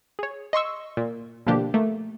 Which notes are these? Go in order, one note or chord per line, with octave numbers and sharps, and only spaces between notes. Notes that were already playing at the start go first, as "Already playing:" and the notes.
G#4 C#5
D#5 C6 C#6 E6
A#2
B2 D3 F3 A#3 D4 G4
A3 A#3